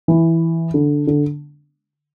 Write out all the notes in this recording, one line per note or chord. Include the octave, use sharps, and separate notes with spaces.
E3
D3
D3